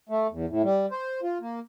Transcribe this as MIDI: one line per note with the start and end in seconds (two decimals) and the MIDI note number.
0.09 0.27 57
0.31 0.46 40
0.49 0.62 45
0.64 0.86 55
0.91 1.20 72
1.23 1.38 65
1.41 1.59 58